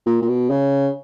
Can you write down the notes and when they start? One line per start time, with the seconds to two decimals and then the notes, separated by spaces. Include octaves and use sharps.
0.06 A#2
0.22 A#2
0.28 B2
0.50 C#3